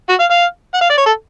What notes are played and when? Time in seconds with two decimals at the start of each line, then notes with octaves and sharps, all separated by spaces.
0.09 F#4
0.20 F5
0.31 F5
0.74 F#5
0.81 F5
0.90 D5
0.98 C#5
1.06 A4